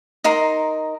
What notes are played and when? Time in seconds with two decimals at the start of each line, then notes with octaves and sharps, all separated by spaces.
0.24 D#4 A#4 C6